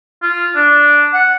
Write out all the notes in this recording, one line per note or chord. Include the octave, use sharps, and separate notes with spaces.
F4
D4
F#5